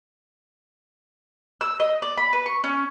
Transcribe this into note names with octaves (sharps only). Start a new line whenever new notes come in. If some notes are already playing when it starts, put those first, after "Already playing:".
E6
D#5
D5
B5
B4
C#6
C#4